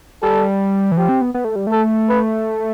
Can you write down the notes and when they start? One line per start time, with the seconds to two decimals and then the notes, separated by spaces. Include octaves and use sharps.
0.22 G3 A4
0.92 E3
0.97 F3 G4
1.09 C4
1.21 B3
1.34 B3
1.45 A3
1.56 G3
1.67 A3 A4
2.09 B4